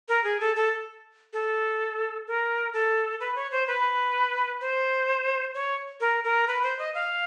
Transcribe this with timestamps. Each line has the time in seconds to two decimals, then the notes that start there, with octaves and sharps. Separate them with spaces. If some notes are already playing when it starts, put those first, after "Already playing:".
0.09 A#4
0.24 G#4
0.40 A4
0.56 A4
1.33 A4
2.27 A#4
2.73 A4
3.20 B4
3.35 C#5
3.51 C5
3.68 B4
4.61 C5
5.54 C#5
6.01 A#4
6.24 A#4
6.48 B4
6.63 C5
6.79 D#5
6.94 F5